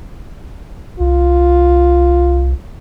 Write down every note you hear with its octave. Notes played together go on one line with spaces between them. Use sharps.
C2 F4